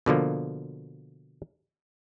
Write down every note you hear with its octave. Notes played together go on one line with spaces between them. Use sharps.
B2 D3 F3 A#3